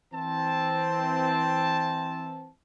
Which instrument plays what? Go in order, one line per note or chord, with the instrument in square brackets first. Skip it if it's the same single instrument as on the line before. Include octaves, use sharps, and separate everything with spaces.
[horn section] E3 C4 A5